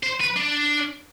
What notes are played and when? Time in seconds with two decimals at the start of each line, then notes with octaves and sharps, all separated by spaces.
0.03 C5
0.20 B4
0.36 D4